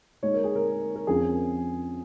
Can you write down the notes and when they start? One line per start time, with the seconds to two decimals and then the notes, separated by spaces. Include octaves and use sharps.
0.23 A#2 G#3 D#4 C#5
0.34 A#4
0.44 G#4
0.56 A#4
0.96 A#4
1.07 F2 F3 C#4 G#4